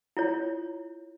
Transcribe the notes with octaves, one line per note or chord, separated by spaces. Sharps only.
E4 F4 C#5